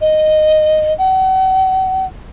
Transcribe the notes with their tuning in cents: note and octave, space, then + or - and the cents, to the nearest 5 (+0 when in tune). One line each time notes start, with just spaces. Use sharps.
D#5 -10
F#5 +40